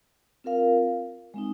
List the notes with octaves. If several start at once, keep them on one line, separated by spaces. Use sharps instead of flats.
C4 F4 A#4 F5
G#3 C4 D#4